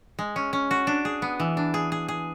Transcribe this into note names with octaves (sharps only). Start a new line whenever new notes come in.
G#3
C#4
C#4
F#4
D4
G#4
B3
E3
D4
G#4
G#4
G#4